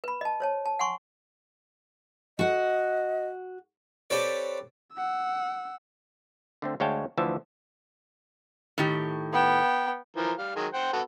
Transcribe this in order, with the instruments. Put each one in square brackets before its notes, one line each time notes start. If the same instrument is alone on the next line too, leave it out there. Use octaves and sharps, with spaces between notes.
[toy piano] B4 B5
D#5 A5
C5 C#5 A5
A5
F#5 G#5 C6 C#6
[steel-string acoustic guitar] F#4 F#5 [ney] D#5
[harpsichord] C4 G4 A4 B4 C#5 D5
[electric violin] F#5 E6
[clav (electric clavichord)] D3 A3 C4
D2 G#3 C#5 F5 G5 A5
D2 E3 F3 E5 A5
[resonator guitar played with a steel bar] A2 D#3 G4
[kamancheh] B3 G5
[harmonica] E3 F3 A#4
G3 F5
D#3 F#3 G#3
C5 F#5 G5
B3 F#4 A4